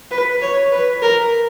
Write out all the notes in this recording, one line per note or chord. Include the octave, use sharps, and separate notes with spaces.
B4
C#5
B4
A#4